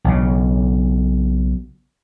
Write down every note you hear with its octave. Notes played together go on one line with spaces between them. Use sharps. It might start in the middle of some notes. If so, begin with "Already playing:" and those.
B1 C#3